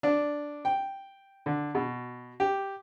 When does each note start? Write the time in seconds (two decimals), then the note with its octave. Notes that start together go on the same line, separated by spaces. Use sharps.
0.03 D4
0.65 G5
1.46 D3
1.75 B2
2.40 G4